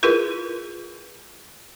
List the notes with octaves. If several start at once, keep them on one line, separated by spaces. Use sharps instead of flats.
E4 F4 G#4 A#4 B4